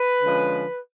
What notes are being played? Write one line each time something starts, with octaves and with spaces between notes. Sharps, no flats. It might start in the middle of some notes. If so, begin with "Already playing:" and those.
Already playing: B4
D3 F3 G#3 C#4